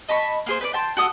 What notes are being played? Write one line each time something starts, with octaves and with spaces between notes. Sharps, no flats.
D#5 A5 B5 C#6
A#3 G#4 C5
B4 C5 D5
G5 A5 C6
F#4 A4 D#6 F#6